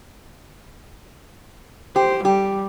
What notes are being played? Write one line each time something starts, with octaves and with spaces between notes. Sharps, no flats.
G4 C5
G3 G4